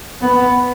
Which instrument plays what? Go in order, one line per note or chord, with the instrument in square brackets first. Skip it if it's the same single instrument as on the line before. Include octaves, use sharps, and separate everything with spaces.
[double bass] B3